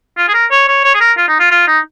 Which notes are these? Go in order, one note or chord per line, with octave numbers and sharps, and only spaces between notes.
F4
G#4
A#4
C#5
C#5
C#5
G#4
A#4
F4
D#4
F4
F4
D#4